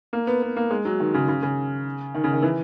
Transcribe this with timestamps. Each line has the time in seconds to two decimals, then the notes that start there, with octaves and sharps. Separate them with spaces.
0.13 A#3
0.27 B3
0.42 B3
0.56 A#3
0.70 G#3
0.85 F#3
1.00 D#3
1.14 C#3
1.28 C#3
1.43 C#3
2.14 D#3
2.24 C#3
2.33 D#3
2.43 E3